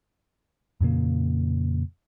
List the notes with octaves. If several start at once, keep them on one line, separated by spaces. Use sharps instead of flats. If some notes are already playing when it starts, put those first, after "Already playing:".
F2 A#2 C#3 A#3